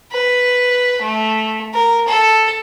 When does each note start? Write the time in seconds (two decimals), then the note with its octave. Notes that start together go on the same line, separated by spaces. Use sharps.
0.12 B4
1.02 A3
1.74 A#4
2.07 A4